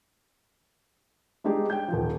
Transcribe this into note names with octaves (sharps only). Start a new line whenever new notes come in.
G3 G#3 D4 D#4 G4 G#4
G5 G6
D#1 F3